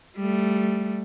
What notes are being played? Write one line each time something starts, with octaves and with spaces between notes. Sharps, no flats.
G3 A3